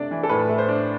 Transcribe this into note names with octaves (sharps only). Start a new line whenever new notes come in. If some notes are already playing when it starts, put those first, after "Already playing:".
Already playing: C3 A3 D4 D5
E3
A4
A2 B4
A3
C5
D4